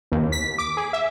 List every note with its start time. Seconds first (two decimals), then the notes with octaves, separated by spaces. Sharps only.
0.12 D#2
0.32 B6
0.58 D6
0.77 G#4
0.93 E5